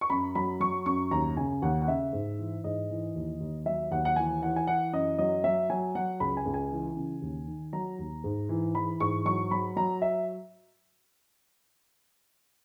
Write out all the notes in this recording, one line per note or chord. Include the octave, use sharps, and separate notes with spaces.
C#6
F#2 B5
F#3 B5
F#3 C#6
F#2 C#6
D#2 A#5
C#3 G#5
D#2 F#5
F#5
C#3 E5
G#2
E3
G#2 D#5
E3
D#2
D#2
F#3 E5
D#2 F#5
F#5
E3 G#5
E3 F#5
G#5
E3 F#5
F#2 D#5
F#3 D#5
F#3 E5
F#3 G#5
F#3 F#5
C#2 B5
G#5
C#2
G#5
E3
C#3
D#2
D#3
F#3 A#5
D#2
G#2
E3
E3 B5
G#2 C#6
F#3 C#6
F#3 B5
F#3 A#5
E5